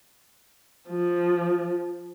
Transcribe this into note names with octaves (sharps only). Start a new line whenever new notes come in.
F3